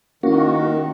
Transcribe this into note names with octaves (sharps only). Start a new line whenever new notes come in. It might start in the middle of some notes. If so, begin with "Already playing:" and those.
D#3 A#3 C#4 E4 F#4